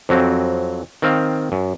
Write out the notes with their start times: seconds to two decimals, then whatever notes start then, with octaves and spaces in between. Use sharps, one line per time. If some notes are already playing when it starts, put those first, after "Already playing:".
0.09 F2 F#3 C4
1.02 D#3 C4 F5
1.52 F#2